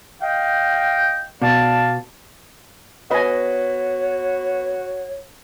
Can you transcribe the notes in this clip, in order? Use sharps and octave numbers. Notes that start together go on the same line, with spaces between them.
D#5 F5 G5
B2 D5 F5 A5
B3 F#4 B4 C#5 D#5 G#5 B5